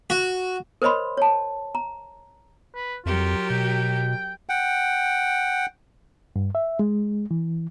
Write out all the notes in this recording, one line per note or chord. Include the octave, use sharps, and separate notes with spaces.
F#4
A#4 C5 C#5 D#5 B5 C6
C#5 A5
A#5
B4
F2 F#3 F4 G4 A#4
B2 G5
F#5 G5
G2
E5
G#3
E3